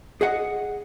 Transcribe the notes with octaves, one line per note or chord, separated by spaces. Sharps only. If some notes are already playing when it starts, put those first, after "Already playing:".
G#4 D#5 F#5